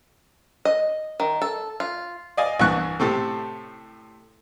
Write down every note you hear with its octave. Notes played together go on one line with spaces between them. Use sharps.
D#5
D#3
A4
F4
D5 D#5 F5 G#5 D#6
C2 G2 E3 C#6 F#6
A2 C3 A4